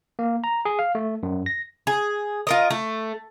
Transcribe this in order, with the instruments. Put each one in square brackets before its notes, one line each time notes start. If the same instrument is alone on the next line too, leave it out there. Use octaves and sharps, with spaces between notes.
[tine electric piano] A#3
A#5
G#4
F5
A3
F#2
A#6
[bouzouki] G#4
F4 A#4 D#5
A3